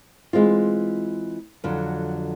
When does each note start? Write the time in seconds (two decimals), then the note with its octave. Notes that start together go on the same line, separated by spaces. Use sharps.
0.33 E3 G#3 C4 F4
1.64 F2 D3 F#3